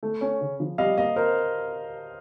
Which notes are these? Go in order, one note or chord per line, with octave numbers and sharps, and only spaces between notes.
A3
C#4
C#3
F3
G3 D#5 F5
A#3 D#5 F5
A#4 C5